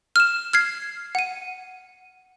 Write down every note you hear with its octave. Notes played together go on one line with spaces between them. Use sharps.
F6 E7
F6 G#6 C7
F#5 D#7